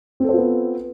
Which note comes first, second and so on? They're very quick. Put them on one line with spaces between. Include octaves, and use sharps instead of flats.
C4 A4 C5 F4 B3